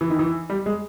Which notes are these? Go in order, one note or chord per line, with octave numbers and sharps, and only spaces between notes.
E3
D#3
E3
G3
G#3